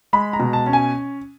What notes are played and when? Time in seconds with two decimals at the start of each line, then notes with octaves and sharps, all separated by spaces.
0.13 G#3 B5
0.33 A#5
0.40 B2
0.53 A5
0.66 C#4
0.73 G#5